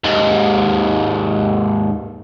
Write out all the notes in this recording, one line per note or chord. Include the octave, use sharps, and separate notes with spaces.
D#2 G#2